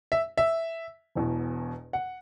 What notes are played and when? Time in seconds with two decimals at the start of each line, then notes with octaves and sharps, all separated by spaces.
0.12 E5
0.38 E5
1.15 E1 E2 B2
1.93 F#5